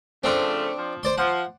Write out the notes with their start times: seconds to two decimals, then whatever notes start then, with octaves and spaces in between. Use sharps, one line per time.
0.24 C#3 F3 A3 C4 D4 D5
0.78 F3
1.03 C5 D5 C6
1.18 F3 F#5